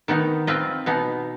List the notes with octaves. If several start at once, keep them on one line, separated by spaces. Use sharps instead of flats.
D#3 B3 D#4
C4 F4 B4 D#5
B2 B3 D#4